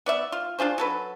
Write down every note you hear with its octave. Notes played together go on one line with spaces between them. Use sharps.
B3 D5 E5
F4
D4 F4 G#4 C5
F#3 A4 B4